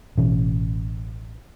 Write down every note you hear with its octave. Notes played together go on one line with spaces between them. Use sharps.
A1 B2 E3 C#4